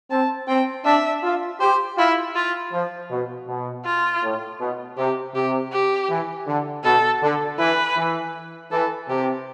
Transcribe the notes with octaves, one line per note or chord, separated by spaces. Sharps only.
C4 A5
C4 G5
D4 E5
F4
G4 C5
E4 F4
F4
F3
B2
B2
F4
A2
B2
C3 G4
C3 G4
G4
E3
D3
B2 A4
D3
E3 B4
E3
E3 A4
C3 G4